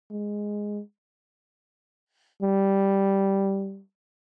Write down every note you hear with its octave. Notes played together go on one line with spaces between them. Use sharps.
G#3
G3